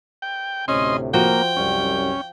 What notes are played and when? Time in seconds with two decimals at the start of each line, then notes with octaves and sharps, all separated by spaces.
0.22 G5
0.68 D2 A2 C3 C#4 D#5 C6
1.14 F3 A#3 F#4 G5
1.57 C2 F#2 G3 C#4